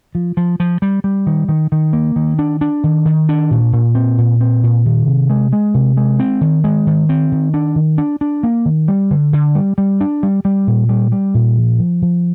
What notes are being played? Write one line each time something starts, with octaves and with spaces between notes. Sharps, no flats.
F3
F3
F3
G3
G3
D#3
D#3
D#3
A#3
D#3
D4
D4
D#3
D#3
D4
A#2
A#2
C4
A#2
C4
A#2
D#3
C3
G#3
G#3
C3
G#3
C4
D#3
G#3
D#3
C4
D#3
D4
D#3
D4
D4
A#3
D#3
G3
D3
D3
G3
G3
D4
G3
G3
A#2
G3
G3
A#2
F3
F3
F3